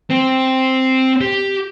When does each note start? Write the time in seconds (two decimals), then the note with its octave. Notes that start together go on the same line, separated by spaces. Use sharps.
0.10 C4
1.21 G4